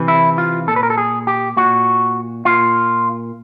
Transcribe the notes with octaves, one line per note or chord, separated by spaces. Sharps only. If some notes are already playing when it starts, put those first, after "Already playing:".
Already playing: C3 E3
E4
F4
A#2 A4
B4
A#4
A4
G#4
G4
A#2 F#4
A#2 F4